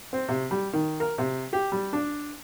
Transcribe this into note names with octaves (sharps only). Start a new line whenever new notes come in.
C4
C3
G3
D#3
A#4
C3
G4
G3
D4